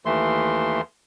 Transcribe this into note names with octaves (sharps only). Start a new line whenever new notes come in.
D#2 E3 A3 C6